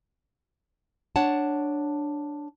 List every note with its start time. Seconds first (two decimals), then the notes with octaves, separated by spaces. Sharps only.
1.16 D4 C#5 F#5 A5